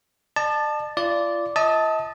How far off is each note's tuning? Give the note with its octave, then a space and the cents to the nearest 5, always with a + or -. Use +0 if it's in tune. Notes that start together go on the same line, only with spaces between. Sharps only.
D5 +45 A5 +0
F4 -35 D5 -10
D#5 +40 A5 +0 D#6 -15